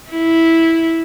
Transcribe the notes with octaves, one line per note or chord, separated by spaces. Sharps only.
E4